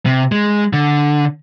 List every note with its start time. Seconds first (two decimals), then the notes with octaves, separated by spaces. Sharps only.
0.06 C3
0.32 G#3
0.73 D3